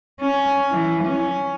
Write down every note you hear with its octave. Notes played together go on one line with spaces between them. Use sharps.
C#4
E3
C#4